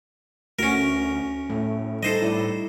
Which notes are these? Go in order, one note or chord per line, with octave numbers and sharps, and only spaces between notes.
D2 A3 C#4 F#4 A#4
A2 A3
G3 D#4 A4 C5 D#5
E4 D5